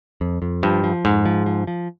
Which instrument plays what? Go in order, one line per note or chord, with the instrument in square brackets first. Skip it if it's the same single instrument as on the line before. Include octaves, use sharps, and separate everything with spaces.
[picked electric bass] F2
F2
[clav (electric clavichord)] G2 [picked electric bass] F3
[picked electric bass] F3
[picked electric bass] F2 [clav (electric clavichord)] G#2
[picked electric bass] F3
F3
F3